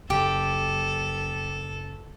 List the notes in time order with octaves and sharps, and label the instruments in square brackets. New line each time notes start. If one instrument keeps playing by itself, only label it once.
[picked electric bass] F#1 [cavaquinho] G4 [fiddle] A4